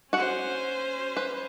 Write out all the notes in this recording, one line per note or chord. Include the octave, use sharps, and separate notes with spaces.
C#4 F#4 C5 F#5
B4